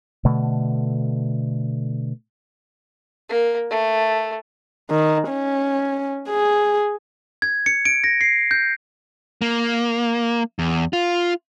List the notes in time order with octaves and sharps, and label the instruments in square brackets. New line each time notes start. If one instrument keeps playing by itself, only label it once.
[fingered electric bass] B2 D3 A3
[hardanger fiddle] A#3
A3
[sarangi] D#3
C#4
G#4
[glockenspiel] G#6
C#7
D7
A#6
C7
G6
[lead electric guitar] A#3
E2
F4